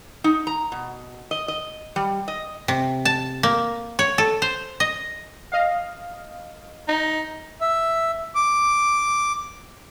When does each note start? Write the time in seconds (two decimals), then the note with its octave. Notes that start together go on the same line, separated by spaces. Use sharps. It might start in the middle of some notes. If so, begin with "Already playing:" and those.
0.24 D#4
0.47 A#5
0.72 B2
1.31 D#5
1.48 D#5
1.96 G3
2.28 D#5
2.68 C3
3.05 A5
3.43 A#3
3.99 C#5
4.18 A4
4.42 C5
4.80 D#5
5.52 D#5 F5
6.88 D#4
7.61 E5
8.35 D6